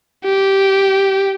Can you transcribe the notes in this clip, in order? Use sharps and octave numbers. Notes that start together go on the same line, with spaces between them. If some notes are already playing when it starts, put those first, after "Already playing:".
G4